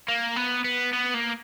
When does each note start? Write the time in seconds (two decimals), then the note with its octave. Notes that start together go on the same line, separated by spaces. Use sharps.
0.08 A#3
0.36 B3
0.64 B3
0.93 B3
1.14 A#3